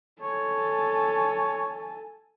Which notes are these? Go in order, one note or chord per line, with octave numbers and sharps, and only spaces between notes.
A4 C#5 G#5